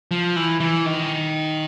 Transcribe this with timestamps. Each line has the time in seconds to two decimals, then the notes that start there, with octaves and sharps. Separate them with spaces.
0.11 F3
0.36 E3
0.60 E3
0.86 D#3